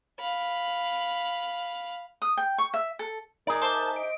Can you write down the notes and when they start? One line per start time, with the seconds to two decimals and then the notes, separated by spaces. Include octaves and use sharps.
0.20 F5 B5
2.22 D#6
2.37 G5
2.58 C#6
2.74 E5
2.99 A4
3.47 D#4 G#4 A#4 D5
3.62 C5 E5 A5 D6
3.96 D#5 D7